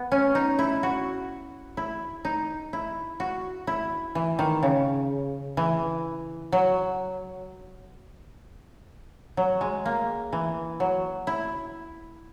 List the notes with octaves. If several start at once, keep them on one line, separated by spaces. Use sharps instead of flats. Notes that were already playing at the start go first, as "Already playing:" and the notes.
Already playing: B3
C#4
D#4
E4
F#4
E4
D#4
E4
F#4
E4
E3
D#3
C#3
E3
F#3
F#3
G#3
A#3
E3
F#3
E4